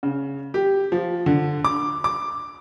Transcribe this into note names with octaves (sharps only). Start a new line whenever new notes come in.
C#3
G4
F3
D3
D6
D6